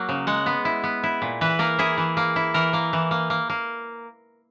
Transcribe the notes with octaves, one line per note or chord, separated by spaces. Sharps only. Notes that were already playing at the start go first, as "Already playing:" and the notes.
Already playing: F#3 A#3
C#3
G#3 F#5
B3
E4
B3
E4
A#2
E3 B4
A#3 A#4
E4 G#4
E3
A#3
E4
E3 A#4
A#3
E3
A#3
A#3
A#3